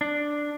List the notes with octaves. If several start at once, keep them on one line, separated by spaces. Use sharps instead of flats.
D4